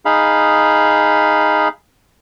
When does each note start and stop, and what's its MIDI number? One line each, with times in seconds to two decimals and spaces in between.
0.05 1.68 63
0.05 1.68 68
0.05 1.68 77
0.05 1.68 83